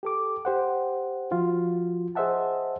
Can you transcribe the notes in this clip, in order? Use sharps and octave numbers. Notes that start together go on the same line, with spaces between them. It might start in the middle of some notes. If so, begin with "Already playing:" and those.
G4 A4 D6
G4 C5 F#5
F3 F4 F#4
G#4 C5 D#5 E5 F#5 A5